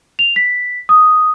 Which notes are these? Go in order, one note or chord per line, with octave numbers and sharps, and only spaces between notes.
F7
B6
D#6